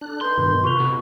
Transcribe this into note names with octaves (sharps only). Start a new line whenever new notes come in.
D4 A4 F#6
D#4 B4 C6 G6
G2 B2 D#3
C3 F4 A4 B4 B5 C#6 F7
B2